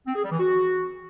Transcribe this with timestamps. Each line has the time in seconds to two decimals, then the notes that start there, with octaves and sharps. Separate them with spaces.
0.07 C4
0.15 G#4
0.23 G3
0.31 E3
0.40 F#4